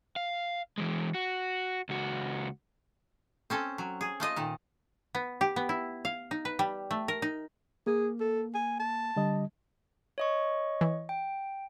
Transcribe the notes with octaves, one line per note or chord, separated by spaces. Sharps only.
F5
E3 G#3
F#4
C#2 F#4
C4 C#4 A4
F#3
G#4
A3 F4 D#5
A#2 D#3
B3
G4
B3
E4
F5
D#4
B4
G3
A3
A#4
D#4
A#3 G#4
A4
G#5
A5
D3 G3 D#5
C#5 D#5 C#6
E3
G5